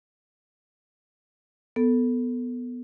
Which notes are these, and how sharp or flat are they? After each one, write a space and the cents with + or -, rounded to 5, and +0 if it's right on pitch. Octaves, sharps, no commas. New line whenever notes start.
B3 +0 A4 +10